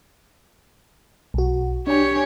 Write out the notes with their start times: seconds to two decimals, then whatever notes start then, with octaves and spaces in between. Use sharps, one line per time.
1.34 B1 F#4
1.87 D4 G4 C#5 G#5